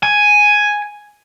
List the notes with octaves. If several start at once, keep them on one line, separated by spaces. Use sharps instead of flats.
G#5